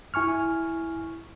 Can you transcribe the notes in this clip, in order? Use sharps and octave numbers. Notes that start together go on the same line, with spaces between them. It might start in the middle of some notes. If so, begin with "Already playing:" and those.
E4 G#5 C#6 F6